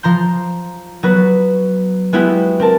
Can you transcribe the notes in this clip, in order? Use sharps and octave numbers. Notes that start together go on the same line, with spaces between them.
F3 A#5 C6 G6
F#3 B3 F#4 B4
G#3 B3 E4 F#4 G4
C4 A#4 A5